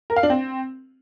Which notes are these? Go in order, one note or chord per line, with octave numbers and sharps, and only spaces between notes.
A#4
F5
D4
C4